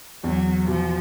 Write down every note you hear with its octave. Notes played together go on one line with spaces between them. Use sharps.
E2 F#3
B2 F3